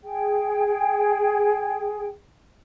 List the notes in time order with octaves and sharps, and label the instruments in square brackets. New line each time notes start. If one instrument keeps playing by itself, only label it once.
[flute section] G#4 G5